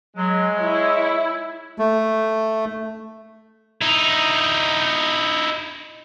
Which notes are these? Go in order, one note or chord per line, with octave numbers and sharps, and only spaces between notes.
F#3 G#3
E4 C#5
A3
D#4 E4